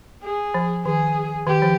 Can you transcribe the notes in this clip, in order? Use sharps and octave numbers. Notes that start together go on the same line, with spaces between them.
G#4
F3
D#3 G#4
D#3 G4
F3